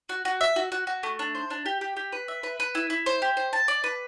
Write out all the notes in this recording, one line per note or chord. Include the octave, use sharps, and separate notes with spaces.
F#4
F#4
E5
F#4
F#4
F#4
A3
D4
C5
D4
G4
G4
G4
B4
E5
B4
B4
E4
E4
C5
G4
C5
A5
D5
B4